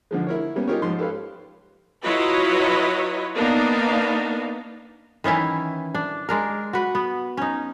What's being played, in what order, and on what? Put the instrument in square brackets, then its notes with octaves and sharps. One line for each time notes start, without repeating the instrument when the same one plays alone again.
[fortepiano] D3 F3 G#3
E4 A#4 C#5
G3 A#3 B3 C#4
D#4 F4 G4 G#4 A#4 C#5
G#2 F3 C6
G4 A4 B4 C#5 F5
[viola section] F#3 E4 F4 B4 C#5 D#5
A#3 B3 D4 D#4 F5
[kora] D#3 E3 C#4 E4
D4
G#3 D4 A#4
F#4 B4
B3
C#4 D#4